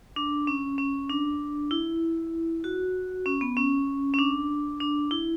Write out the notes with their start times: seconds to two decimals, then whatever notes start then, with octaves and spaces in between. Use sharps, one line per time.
0.16 D4
0.47 C#4
0.78 C#4
1.10 D4
1.71 E4
2.64 F#4
3.26 C#4
3.41 B3
3.57 C#4
4.14 C#4
4.19 D4
4.80 D4
5.11 E4